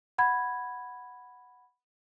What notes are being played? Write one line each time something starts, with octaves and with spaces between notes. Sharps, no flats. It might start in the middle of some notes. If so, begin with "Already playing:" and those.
F#5 B5 G#6